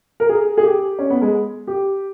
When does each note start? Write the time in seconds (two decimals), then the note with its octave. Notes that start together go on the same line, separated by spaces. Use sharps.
0.20 A#4
0.29 G#4
0.57 G#4
0.63 G4
0.99 C#4
1.10 B3
1.22 G#3
1.67 G4